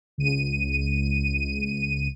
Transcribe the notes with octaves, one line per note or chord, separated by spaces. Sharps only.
C#2 D#7